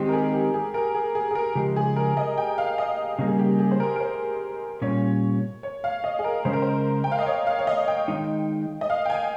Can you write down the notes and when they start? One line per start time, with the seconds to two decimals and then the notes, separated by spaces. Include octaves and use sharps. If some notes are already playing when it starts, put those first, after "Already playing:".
Already playing: D#3 G#3 C4 D#4 G4
0.09 A#4
0.13 G#4
0.33 G4
0.54 G#4
0.74 A#4
0.95 G#4
1.15 G#4
1.31 G#4
1.35 A#4
1.55 C#3 F3 G#3 G4
1.76 G#4
1.96 A#4
2.17 D#5
2.38 G5
2.58 F5
2.78 D#5
3.19 C#3 G3 A#3
3.27 G#4
3.39 G4
3.59 G#4
3.71 C5
3.80 A#4
3.96 A#4
4.00 C5
4.82 A#2 G3 C#4 C#5
5.63 C#5
5.84 F5
6.04 D#5
6.19 G#4
6.24 A#4
6.45 C#3 G#3 C#4 C5
6.53 A#4
6.62 C5
7.04 G5
7.12 F5
7.19 D#5
7.27 C#5
7.47 F5
7.59 C#5
7.67 D#5
7.88 G5
8.08 D#3 G#3 D#4
8.81 D#5
8.90 F5
9.05 G5
9.10 G#5